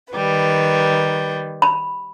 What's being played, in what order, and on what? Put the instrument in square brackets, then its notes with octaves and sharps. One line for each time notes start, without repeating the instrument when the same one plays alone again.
[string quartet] D#3 G3 B4
[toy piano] B5